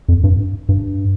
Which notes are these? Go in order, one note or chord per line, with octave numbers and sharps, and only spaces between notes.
F2
G2
G2